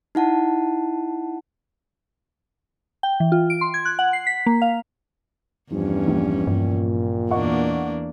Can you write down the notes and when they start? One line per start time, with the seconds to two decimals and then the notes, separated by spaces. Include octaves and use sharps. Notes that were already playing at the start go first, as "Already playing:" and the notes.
0.15 D#4 E4 F#5 A5
3.03 G5
3.20 E3
3.32 F4
3.50 D7
3.61 C6
3.74 G#6
3.85 F#6
3.99 F#5
4.13 C7
4.27 B6
4.46 A#3
4.62 F5
5.71 E2 G2 F3 C#4
6.07 A#1
6.47 G2 A#2
7.31 E2 A#3 D4 D#5 F#5 C#6